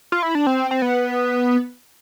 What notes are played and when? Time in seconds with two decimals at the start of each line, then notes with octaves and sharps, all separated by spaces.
0.12 F4
0.23 E4
0.35 D4
0.47 C4
0.71 C4
0.82 B3